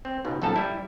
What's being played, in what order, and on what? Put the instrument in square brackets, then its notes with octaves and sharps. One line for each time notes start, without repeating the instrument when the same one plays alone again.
[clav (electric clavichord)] C4
C#2 G#2 B2
A#1 F#2 F3 A4 A5 A#5
G3 E4